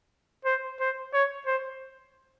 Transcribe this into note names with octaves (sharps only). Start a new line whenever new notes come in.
C5
C5
C#5
C5